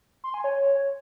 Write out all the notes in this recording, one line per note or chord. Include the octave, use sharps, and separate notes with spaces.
C6
G#5
C#5